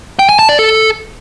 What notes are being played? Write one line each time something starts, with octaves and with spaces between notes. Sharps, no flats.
G5
G#5
A5
D5
A4